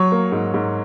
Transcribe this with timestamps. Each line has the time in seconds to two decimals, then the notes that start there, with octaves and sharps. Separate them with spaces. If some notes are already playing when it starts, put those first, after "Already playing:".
Already playing: F#3 C#5
0.12 A#3
0.32 G#2
0.54 G#2